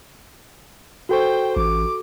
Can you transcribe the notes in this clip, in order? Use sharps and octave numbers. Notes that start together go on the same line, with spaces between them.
F#4 A4 C5 G5 C#6
A1 D6